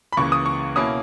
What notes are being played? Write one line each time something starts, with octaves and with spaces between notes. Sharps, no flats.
B5
C#2 C#3 E3 A#3 C#6
D#6
C#6
B2 A#3 C#4 E4 D#6